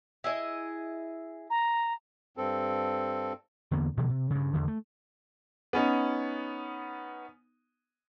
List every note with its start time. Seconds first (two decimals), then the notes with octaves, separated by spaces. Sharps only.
0.24 E4 G#4 D#5
1.50 A#5
2.37 G2 C4 A4
3.71 E2 D3 A#3 B3
3.97 B2 D3 F3 A#3
4.10 C3
4.30 G2 C#3
4.53 E2 D3 D#3
4.68 A3
5.73 B3 C#4 D#4